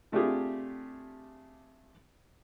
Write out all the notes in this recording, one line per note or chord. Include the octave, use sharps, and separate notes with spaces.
C3 A3 D4 F4 G4 G#4